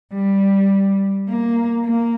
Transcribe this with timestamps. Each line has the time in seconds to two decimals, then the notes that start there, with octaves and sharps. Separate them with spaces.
0.14 G3
1.29 A#3
1.85 A#3